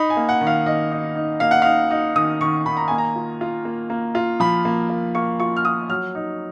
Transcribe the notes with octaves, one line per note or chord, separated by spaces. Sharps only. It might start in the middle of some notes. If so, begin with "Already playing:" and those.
Already playing: D#4 B5
G#5
A#3
F#5
D#3
F5
D#3 D#5
D#4
D#4
A#3 F5
F#5
D#4 F5
D#4
D#3 D#6
D#3 C#6
D#3 B5
A#5
A#3 G#5
A#5
F4
F4
A#3
A#3
F4
F3 B5
A#3
A#3
A#3 C#6
F4 C#6
F6
F4 D#6
F#3 F6
D#4